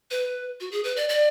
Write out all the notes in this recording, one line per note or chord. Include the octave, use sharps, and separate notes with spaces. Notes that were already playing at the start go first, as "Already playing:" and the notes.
B4
F#4
G#4
B4
D5
D5